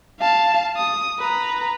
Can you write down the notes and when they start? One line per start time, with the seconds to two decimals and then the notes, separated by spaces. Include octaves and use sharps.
0.20 F5 A5
0.77 D#6
1.19 B4 A#5